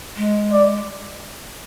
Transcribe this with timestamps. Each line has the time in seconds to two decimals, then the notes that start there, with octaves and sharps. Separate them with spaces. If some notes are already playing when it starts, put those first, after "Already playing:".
0.17 G#3
0.53 D5